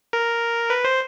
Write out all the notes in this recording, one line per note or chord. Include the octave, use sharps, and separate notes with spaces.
A#4
B4
C5